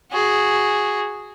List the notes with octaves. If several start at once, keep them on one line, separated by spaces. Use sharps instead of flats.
F#4 G#4